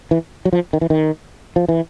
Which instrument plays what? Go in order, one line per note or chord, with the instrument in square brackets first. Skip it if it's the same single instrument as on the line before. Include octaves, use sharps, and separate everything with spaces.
[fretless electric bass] E3
F#3
F3
D#3
E3
D#3
F3
E3